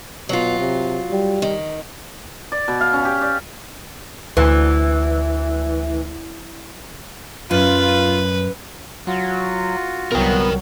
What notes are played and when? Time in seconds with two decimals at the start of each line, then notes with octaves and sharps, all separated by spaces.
0.29 B2 F#3 F4
0.59 C3
1.11 G3
1.42 D#3
2.52 D5
2.68 B2
2.81 F5
2.93 C#4
3.05 G4
3.21 D5
4.37 D2 E3
7.51 F#2 F4 B4
9.07 F#3 F4 F#4
10.12 C2 F#3 B3 A#4 G5